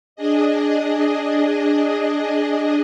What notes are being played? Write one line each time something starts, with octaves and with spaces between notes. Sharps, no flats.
D4 G#4 D#5